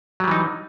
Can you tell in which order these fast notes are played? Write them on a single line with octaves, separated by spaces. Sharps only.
F#3 G3 E3 D#4